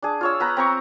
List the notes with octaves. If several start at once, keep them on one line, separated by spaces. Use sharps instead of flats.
D4 G#4
F4 C#5 E6
B3 B4 A#5
C4 A#5 C#6